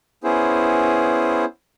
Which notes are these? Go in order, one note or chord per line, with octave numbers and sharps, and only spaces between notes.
B3 C#4 E4 G#4 C5